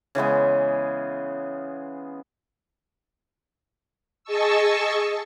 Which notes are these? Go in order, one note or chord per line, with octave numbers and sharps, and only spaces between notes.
C#3 E3 G#3 B3
G#4 D#5 A5 C#6 E6